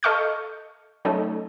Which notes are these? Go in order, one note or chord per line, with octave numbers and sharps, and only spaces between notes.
A4 D#5 F5 C#6 F6 G6
F#3 A3 C#4 D#4